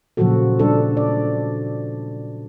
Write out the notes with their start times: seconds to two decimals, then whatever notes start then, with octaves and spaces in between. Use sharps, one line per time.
0.17 A#2 C#3 F3 F#3 F#4 A4
0.60 G3 D4 A4
0.97 D5